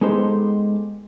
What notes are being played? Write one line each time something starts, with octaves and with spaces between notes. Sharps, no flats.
G#3 B3 D#4 G4 A4 C5